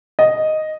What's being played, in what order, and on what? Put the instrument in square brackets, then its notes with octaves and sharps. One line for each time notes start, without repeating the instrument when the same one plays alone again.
[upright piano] D#5